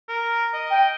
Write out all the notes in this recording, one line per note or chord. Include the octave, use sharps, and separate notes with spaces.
A#4
D#5
G5